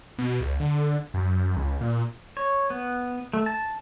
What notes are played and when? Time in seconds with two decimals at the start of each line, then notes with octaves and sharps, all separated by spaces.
0.19 B2
0.41 C#2
0.60 D3
1.14 F#2
1.57 C#2
1.81 A#2
2.37 C#5
2.70 B3
3.34 A3
3.46 A5